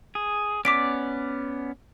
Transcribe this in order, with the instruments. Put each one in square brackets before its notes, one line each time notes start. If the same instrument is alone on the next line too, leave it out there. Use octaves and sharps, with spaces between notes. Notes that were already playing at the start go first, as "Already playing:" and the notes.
[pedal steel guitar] G#4
[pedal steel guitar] B3 C#4 D5 [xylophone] D6 B6 D7